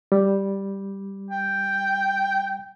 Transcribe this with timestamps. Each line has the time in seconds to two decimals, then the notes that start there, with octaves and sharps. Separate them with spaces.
0.12 G3
1.31 G5